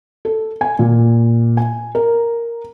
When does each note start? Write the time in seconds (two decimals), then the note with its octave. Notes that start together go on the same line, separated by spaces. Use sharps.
0.25 A4
0.61 G#5
0.79 A#2
1.57 G#5
1.95 A#4